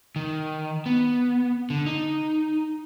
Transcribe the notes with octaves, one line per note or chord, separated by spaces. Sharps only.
D#3
B3
D3
D#4